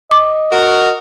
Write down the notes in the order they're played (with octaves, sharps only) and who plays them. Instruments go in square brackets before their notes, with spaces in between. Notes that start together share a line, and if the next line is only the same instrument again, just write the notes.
[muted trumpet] D#5 [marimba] D6
[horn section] F#4 A#4